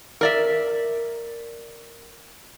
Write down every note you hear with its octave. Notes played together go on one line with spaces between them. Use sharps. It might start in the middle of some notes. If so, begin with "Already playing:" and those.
A#4 D5 E5